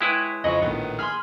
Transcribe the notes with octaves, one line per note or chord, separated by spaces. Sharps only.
G#3 E4 B4 C#5 G5
F2 C#3 F3 D#5 B5 C#6
A#1 A2 D#3 B3
G#4 B5 C6 F6